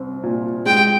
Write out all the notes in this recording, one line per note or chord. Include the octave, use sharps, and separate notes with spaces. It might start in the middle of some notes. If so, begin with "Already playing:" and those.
Already playing: C2 C4
A#2
G#3 G5